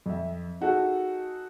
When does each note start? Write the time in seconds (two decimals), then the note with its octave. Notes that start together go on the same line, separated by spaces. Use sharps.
0.06 F2 E5
0.61 D#4 F#4 G#4 A4